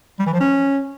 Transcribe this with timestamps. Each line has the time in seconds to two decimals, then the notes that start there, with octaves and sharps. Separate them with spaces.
0.19 G3
0.26 E3
0.33 F3
0.40 C#4